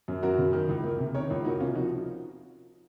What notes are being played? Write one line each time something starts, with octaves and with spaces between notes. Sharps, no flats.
F#2
F#2 F#4 A#4
C#3
D#3
C#2
A#3
C3
D#3 A#4 C#5
C#2
A#3 D#4 F#4
C3 C#4 F4
F3 D#4 F#4